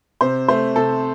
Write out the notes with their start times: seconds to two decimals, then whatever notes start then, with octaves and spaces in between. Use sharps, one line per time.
0.21 C3 C5
0.48 A3 C5
0.76 C3 A4